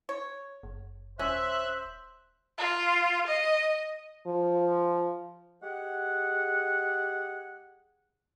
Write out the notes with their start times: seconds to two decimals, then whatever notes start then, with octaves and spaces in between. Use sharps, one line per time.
0.09 C#5
0.63 F#1
1.19 D#1 C#4 C5 E5 F#6
2.58 F4
3.27 D#5
4.26 F3
5.62 G#3 G4 G#4 F#5